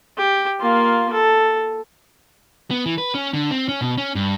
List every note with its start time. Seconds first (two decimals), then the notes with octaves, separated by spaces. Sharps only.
0.17 G4
0.60 A#3 F4
1.13 A4
2.71 B3
2.86 E3
2.98 B4
3.15 C#4
3.33 D3
3.51 C4
3.69 C#4
3.81 B2
3.98 C#4
4.15 G2